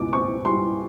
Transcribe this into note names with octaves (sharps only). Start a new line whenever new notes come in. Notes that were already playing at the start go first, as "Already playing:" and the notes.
Already playing: C#2 B2 D6
C4 C#6
G3 C6